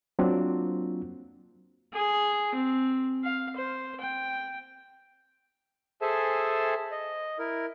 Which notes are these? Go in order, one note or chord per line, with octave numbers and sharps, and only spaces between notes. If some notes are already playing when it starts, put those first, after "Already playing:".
F#3 A#3 C4 D4 F4
G#4
C4
F5
C5
G5
G#4 A4 C5 E5 G#5 A5
D#5
E4 A#4